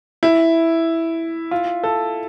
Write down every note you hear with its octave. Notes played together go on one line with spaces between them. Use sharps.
E4
F4
A4